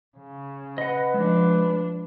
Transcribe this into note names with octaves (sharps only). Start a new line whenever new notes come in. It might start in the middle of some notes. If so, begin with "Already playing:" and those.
C#3
B4 D#5 F#5
F3 G#3 D4